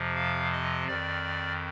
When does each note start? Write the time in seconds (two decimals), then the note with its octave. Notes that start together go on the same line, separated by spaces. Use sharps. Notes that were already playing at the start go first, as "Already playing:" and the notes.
Already playing: F2 C3 F3
0.15 F5
0.52 D#5
0.88 F2 D#3 D5